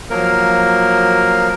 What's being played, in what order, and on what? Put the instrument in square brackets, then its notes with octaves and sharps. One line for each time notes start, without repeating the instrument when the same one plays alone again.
[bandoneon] F3 F#3 A#3 A#4